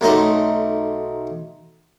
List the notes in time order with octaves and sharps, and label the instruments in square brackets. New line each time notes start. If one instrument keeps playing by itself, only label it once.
[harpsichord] B1 A3 D#4 D#5 C6